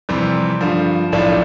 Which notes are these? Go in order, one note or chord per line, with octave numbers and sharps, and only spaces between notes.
F2 C3 E3 G3 C4
G2 D3 F3
B1 A2 F3 A3 D4